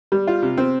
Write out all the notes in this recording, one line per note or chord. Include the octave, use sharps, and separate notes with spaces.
G3
F4
C3
C4